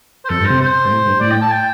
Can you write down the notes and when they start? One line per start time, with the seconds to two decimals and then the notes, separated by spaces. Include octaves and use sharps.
0.25 C5
0.29 F2 A4
0.40 G2
0.46 C3 C5
0.61 C5
0.85 G2
0.91 A2
1.06 G2
1.20 A2 D5
1.31 G5
1.41 A5
1.51 G5